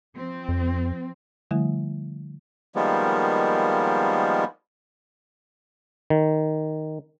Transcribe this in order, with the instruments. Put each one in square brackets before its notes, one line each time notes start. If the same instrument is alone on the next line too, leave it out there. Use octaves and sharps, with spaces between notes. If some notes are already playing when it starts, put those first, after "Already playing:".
[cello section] F3 C4
[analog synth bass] F2
[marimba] D3 F3 G3 A3 E4
[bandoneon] D#3 F3 G3 G#3 A#3 B3
[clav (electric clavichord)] D#3